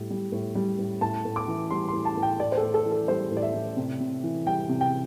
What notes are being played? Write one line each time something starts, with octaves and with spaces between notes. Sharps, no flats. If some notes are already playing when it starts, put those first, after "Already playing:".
Already playing: A2 G3
G3
A2
G3
A2
A2 A5
A2
D6
E3
G3 C6
A2 C6
A5
A2
G5
A2 D5
C5
A4
A2
A4
E3
A4
G3 C5
A2
D5
E5
A2
C3
C3
E3
G3 G5
C3
G5